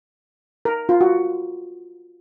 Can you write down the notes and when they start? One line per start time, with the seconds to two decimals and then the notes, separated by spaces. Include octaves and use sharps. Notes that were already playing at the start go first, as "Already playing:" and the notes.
0.65 A#4
0.89 F4
1.01 F#4